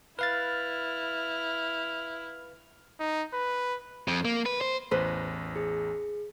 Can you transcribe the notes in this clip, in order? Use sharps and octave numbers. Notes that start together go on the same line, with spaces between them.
E4 B4 F5 F6 A6
D#4
B4
F2
A#3
B4
C5
A1 E2 B4 C5
G#4